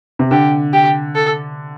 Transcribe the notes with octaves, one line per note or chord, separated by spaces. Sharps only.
C3
D3 G4
G4
A4